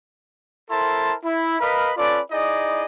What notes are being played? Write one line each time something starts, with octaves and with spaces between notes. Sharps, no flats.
E4 A4 A#4 C5 A5 C6
E4
A#4 B4 D#5 F5 B5
C#4 F4 A4 B4 D5
D#4 E4 G#4 D5 D#5